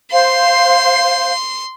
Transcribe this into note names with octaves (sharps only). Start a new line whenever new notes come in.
C5 F5 C6